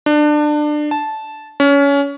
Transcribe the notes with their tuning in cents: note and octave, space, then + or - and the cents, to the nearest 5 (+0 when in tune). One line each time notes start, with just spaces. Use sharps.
D4 +25
A5 -10
C#4 +25